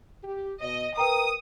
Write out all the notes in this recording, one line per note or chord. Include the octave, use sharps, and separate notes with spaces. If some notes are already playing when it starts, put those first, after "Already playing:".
G4
B2 D#5
A#4 B4 G5 A#5 D#6